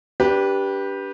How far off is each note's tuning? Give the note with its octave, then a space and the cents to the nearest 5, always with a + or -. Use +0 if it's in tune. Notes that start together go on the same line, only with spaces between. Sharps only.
D4 -25 G4 +0 B4 -20